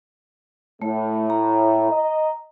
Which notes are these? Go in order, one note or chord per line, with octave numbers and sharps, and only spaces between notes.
A2 A3
A#5
D#5